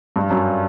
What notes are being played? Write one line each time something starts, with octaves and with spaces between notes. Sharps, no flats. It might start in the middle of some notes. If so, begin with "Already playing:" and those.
G2
F#2